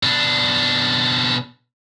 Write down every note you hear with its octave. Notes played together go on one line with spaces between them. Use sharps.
B2 D4